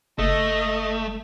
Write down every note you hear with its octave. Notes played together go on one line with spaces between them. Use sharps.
F#1 A3 D#5